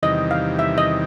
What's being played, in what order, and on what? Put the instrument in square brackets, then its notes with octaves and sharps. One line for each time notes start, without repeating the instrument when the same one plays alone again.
[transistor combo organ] E2 C3 D#3 G3 [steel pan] D#5
[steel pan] F5
E5
D#5